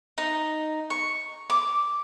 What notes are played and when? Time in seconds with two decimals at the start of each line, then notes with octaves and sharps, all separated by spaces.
0.18 D#4
0.90 C#6
1.50 D6